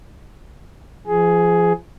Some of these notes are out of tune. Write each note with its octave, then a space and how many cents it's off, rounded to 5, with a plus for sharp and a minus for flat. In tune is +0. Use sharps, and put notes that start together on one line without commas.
F3 -25 G#4 +10